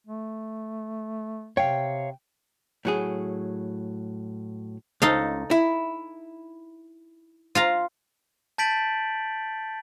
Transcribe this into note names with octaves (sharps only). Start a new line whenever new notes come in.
A3
C3 C#5 F5 G5
A2 F#3 G#4
C#2 D#4 A4 F5
E4
F4 F5 A#5
A5 G6 A6 B6 D7 F#7